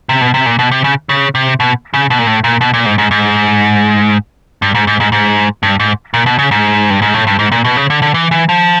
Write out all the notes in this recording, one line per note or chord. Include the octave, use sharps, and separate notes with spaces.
C3
B2
C3
A#2
B2
C3
C#3
C#3
C3
B2
C#3
B2
A#2
A2
A#2
B2
A#2
G#2
G#2
G#2
G2
G#2
G#2
G#2
G#2
G2
G#2
A#2
B2
C#3
G#2
G2
G#2
A2
G2
G#2
A#2
B2
C#3
D3
D3
E3
E3
F3